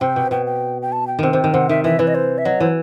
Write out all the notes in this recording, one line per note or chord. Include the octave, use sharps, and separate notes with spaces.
C3 G5
B2
B2 G5
G5
G5
A5
G5
C3 D#3 G5
C3
D#3
C3 F#5
D#3 E5
E3 E5
E3 B4
D#5
C5
E5
F#3 D#5
E3 C5